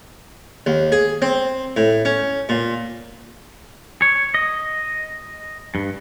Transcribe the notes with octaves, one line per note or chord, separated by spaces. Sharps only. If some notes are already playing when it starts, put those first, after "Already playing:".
D#2
G#4
C4
A2
C#4
A#2
C#5
D#5
G2